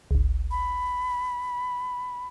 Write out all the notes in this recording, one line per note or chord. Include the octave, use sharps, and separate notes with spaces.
G1 C#2
B5